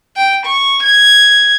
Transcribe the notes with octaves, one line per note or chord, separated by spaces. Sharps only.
G5
C#6
G#6